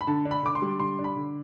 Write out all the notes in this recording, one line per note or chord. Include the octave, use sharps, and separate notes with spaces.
B5
D3 A5
D4
B5
D3 D6
C6
G3
D3 C6
D4
B5
D3